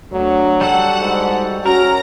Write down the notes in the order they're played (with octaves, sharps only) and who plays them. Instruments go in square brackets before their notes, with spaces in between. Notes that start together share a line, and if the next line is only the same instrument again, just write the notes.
[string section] D2 [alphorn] F#3
[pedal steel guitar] G3 F#4 A4 [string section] F#5
[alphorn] G#2
[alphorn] C#4 [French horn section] F#4 [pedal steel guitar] A#4 [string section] A#5 A#6